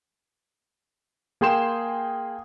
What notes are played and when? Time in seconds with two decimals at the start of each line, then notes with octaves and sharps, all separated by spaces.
1.41 A#3 G#4 G5 C6 E7